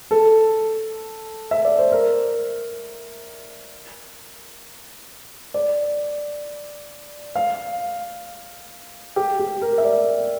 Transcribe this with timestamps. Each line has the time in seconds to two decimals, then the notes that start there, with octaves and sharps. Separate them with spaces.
0.11 A4
1.51 E5
1.65 D5
1.79 C5
1.92 A#4
5.54 D5
7.35 F5
9.16 G4
9.39 G4
9.62 A#4
9.78 E5
9.84 D5